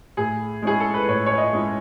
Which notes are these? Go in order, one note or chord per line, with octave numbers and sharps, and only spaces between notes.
A2 G#4
G#3 C#4 E4 G#4
A4
B4
A2 C#5
C#5
D#5
G#3 C#4 E4